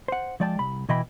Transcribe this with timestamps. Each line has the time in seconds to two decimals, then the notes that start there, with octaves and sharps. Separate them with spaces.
0.08 C5 F#5
0.40 F3 G#3 D5 G5 A5
0.59 C2 B5
0.89 B2 E3 E4 D#5 G5 B5